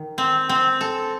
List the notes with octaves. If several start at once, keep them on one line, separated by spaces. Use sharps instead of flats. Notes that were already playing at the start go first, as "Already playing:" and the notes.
Already playing: D#3
C4
C4
A4